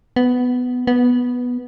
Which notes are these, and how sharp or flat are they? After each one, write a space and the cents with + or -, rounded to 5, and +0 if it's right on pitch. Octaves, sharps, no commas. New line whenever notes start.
B3 +10
B3 -5